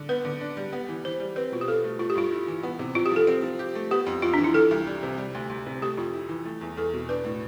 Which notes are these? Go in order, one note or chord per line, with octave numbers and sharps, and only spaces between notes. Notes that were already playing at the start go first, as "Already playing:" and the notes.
Already playing: D3
B3 B4
D3
D4
G3
B3
E3
E3 C5
G3
C4 B4
B2 F4
G4
F4 A4
A3
A3 F4
G4
G2 F4
E4
E3
B3
C3
C3 F4
G4
F3 A4
C4
F3
G4
A3
B3 G4
F2
F2 F4
D4
E3
E4
E3 A4
C2
G3
C3
G3
D2
D2
C3
A3 G4
F2 F4
E4
E3
A3
E2
E2 A4
B2
D4 B4
A2